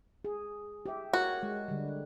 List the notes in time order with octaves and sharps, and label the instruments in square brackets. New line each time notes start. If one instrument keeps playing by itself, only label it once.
[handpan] G#4
G4 E5
[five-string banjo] F#4 [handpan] A#4 C#5
[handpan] G#3
D3 G3